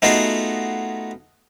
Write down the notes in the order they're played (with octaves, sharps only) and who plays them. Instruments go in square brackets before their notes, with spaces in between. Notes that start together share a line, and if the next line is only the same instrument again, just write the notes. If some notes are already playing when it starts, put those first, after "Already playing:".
[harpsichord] A3 B3 D#4 F4 F#4 G#4